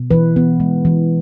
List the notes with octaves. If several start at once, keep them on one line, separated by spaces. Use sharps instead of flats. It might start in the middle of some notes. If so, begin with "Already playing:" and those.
Already playing: B2
E3 B4
B3
G#3
E3